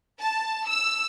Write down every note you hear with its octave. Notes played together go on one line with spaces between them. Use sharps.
A5
E6